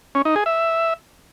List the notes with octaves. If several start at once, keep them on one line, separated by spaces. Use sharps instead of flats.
C#4
D#4
G#4
E5